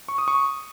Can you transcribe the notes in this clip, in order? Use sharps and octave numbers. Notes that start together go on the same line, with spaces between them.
C#6
D#6
C#6